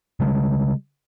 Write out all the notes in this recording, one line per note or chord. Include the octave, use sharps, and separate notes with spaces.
C#3 G3 G#3